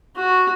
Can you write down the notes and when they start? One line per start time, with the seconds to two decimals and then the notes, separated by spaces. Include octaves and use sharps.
0.17 F#4